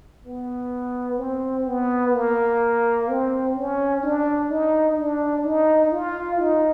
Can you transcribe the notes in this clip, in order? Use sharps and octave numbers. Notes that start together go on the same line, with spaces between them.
B3
C4
B3
A#3
C4
C#4
D4
D#4
D4
D#4
F4
D#4